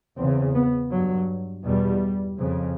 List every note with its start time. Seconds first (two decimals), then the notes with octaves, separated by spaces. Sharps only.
0.17 E2 C#3 C4
0.54 B3
0.91 G2 F#3
1.65 E2 B2 G3
2.39 F2 C#3